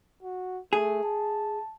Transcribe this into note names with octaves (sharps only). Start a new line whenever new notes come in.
F#4
A3 G#4
A5